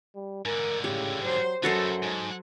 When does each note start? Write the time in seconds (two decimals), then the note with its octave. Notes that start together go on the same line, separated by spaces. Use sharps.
0.15 G3
0.45 G#2 D3 A#4
0.84 A2 C#3 G4
1.23 F#3 C5
1.63 F#2 F#3 A3 B3 F#4 A4 C5
2.03 G#2